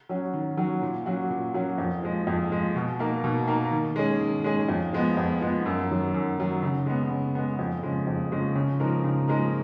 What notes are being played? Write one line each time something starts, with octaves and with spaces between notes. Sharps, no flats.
F#3 C#4 F#4
D#3
F#3 C#4 F#4
A#2
F#3 C#4 F#4
A#2
F#3 C#4 F#4
F2
F3 G#3
F2
F3 G#3
B2
A#3 D#4 A#4
B2
A#3 D#4 A#4
D#3
G#3 C#4 G#4
D#3
G#3 C#4 G#4
F2
F3 G#3 B3
F2
F3 G#3 B3
F#2
D#3 F#3
F#2
D#3 F#3
C#3
G#3 B3
C#3
G#3 B3
F2
C#3 F3 G#3
F2
C#3 F3 G#3
C#3
F3 G#3 D#4 A#4
C#3
F3 G#3 D#4 A#4